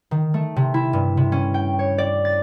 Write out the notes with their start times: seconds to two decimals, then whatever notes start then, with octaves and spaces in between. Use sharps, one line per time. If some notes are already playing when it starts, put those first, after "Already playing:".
0.11 D#3
0.34 A3
0.56 C3
0.74 E4
0.93 G2
1.17 C3
1.32 C#4
1.54 G5
1.79 C#5
1.98 D5
2.25 A6